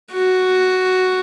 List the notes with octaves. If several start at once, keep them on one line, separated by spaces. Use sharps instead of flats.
F#4